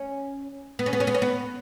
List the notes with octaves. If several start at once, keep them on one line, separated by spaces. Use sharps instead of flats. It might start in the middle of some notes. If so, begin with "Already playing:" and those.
Already playing: C#4
B3
C#4
B3
C#4
B3
C#4
B3